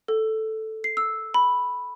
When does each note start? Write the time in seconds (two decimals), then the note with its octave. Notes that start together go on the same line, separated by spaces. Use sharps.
0.08 A4
0.84 C7
0.97 E6
1.34 B5